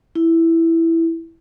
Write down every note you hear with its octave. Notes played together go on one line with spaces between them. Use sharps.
E4